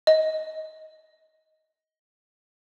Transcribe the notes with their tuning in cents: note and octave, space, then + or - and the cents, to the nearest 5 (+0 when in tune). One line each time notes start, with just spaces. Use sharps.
D#5 +15